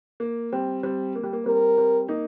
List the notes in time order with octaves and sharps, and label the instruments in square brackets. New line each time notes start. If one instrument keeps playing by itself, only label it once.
[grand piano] A#3
G3 C4
G3 C4
A#3
G3
A#3
[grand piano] G3 C4 [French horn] A#4
[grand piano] G3 C4
A#3 D#4